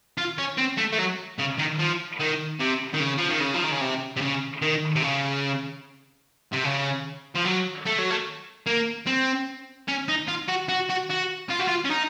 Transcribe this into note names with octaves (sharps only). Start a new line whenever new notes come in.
F4
C#4
C4
A3
A3
F#3
C#3
D#3
F3
D#3
C3
D#3
C#3
F3
D#3
C#3
F3
D#3
C#3
C3
C3
C#3
D#3
C3
C#3
C3
C#3
F3
F#3
A3
F#3
A3
A#3
C4
C#4
D#4
F4
F#4
F#4
F#4
F#4
F4
F#4
F4
C#4
D#4